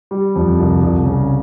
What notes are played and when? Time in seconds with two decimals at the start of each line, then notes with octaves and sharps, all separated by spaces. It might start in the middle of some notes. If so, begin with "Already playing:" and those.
0.11 G3
0.36 F2
0.59 C2
0.83 C2
1.06 C#3